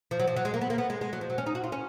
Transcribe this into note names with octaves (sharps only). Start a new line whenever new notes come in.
F3
F#3
F3
F#3
G#3
A#3
B3
A#3
B3
G#3
G#3
F#3
F3
F#3
C#4
D#4
F#4
F4
C#4